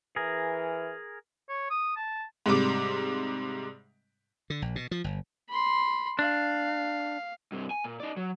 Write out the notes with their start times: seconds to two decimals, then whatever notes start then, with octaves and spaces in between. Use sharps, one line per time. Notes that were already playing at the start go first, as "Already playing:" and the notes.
0.16 E3 G#4 A#4
1.49 C#5
1.70 D#6
1.96 A5
2.46 G#2 C3 G3 D6
4.50 D3
4.62 A#1
4.76 B2
4.91 F3
5.04 G1
5.49 B5 C6
6.19 D4 F5
7.52 G2 C3
7.71 G#5
7.84 A#2
8.00 D#4 D5
8.17 F#3